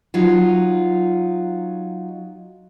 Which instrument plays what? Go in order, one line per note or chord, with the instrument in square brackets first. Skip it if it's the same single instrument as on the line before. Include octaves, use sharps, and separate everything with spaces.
[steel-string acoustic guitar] F#3 D#4 F4